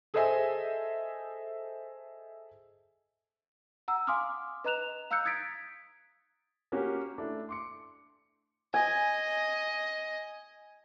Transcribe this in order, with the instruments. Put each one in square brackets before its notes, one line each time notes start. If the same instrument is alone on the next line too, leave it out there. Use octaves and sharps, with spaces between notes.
[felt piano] G#4 A4 C5 D#5 E5 G#5
[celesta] F#5 A#5 E6
F5 G#5 C6 D6 D#6 F6
B4 D#5 A#5 F#6 E7 F7
F5 A#5 E6 F#6 G6 C#7
D#6 G#6 A6 B6 D7
[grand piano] A#3 C#4 F#4 G4
A3 D4 E4
C6 D6 C#7
[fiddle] D#5 [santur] G#5